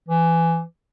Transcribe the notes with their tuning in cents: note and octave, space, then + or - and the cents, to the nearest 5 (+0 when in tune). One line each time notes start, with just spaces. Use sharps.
E3 +15